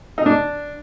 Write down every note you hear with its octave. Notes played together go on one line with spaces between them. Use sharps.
D#4
D4